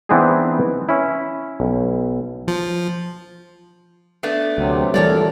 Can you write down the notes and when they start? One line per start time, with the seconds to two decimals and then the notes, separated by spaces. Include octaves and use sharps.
0.09 E3 B3 C4 D4 D#4 G#4
0.89 C#4 E4
1.60 B1
2.48 F3
4.23 A3 B3 D4
4.58 D2 C3 F#3
4.94 A#2 E3 G3 A4 A#4 C#5 D5